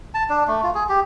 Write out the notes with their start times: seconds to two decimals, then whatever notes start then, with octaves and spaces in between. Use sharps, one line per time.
0.14 A5
0.30 D4
0.48 A3
0.63 F4
0.75 G#4
0.89 G4